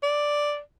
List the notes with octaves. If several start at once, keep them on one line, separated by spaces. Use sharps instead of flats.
D5